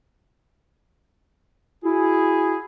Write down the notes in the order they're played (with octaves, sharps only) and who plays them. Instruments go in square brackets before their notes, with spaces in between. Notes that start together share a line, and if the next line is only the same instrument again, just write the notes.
[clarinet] E4 [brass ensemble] F#4 G#4